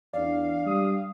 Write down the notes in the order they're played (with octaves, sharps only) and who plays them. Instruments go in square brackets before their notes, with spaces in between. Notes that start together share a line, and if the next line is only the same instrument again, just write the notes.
[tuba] E2 [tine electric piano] D4 D5 [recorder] F5
[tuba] G3 [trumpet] D#6